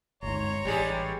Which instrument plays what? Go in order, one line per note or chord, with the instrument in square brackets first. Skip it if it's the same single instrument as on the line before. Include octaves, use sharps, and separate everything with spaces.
[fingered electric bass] G1 D2 G#2 [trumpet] C#5 [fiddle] A#5 C6
[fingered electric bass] A1 [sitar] G3 G#3 G#4